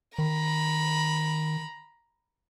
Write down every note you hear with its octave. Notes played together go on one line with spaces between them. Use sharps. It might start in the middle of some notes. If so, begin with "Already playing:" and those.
D#3 A#5 B5